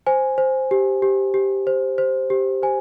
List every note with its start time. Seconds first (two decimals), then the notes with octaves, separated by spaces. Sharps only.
0.07 C5 G#5
0.38 C5
0.71 G4
1.02 G4
1.34 G4
1.67 C5
1.98 C5
2.30 G4
2.62 C5 G#5